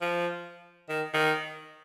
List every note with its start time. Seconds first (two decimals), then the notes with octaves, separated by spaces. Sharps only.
0.01 F3
0.89 D#3
1.14 D#3